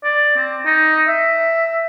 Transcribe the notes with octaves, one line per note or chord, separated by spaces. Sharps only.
D5
C4
D#4
E5